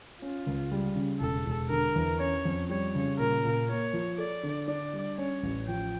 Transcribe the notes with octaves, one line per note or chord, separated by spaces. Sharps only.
C#4 F4
C#2
G3
C#3
E1 A4
E1
D3 A#4
E2
C#4 C#5
F2
G3 C#5
C#3
A#2 A#4
A#2
A#3 C#5
F3
A4 D5
D3
D4 D5
G3
C#4 C#5
A1
F3 G5